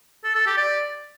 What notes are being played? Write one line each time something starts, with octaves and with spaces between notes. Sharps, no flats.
A4
A4
G4
D5